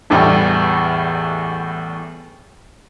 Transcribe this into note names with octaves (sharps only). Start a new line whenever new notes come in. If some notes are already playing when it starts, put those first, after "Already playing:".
A1 E2 A2 G3